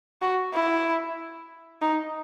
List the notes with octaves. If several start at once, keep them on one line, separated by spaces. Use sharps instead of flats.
F#4
E4
D#4